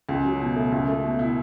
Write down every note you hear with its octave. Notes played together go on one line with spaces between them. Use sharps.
C#2
F#3
B2
A3
C#2
A3
B2
E4